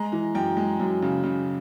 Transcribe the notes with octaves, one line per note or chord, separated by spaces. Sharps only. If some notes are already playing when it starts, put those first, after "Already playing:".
Already playing: G#3 A#5
E3
F#2 G5
G#3
F#2
C#3
C#3